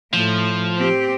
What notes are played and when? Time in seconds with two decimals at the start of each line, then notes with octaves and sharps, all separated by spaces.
0.14 A2 F3
0.76 C4 G4